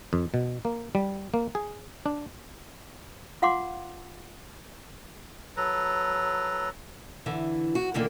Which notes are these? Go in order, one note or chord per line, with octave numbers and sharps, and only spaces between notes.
F2
B2
A#3
G3
A#3
G#4
D4
F4 F5 F#5 C6 D6
F#3 A4 B4 A#5
D3 E3
F#4
A#2 D3 D#3 A#3